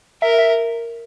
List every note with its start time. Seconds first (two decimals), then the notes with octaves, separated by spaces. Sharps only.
0.22 A#4 E5
0.38 E5